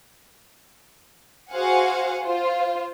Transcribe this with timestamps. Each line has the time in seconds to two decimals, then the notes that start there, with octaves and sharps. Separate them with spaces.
1.52 F#4 G#4 C5 F5 F#5 G#5
2.22 F4 C5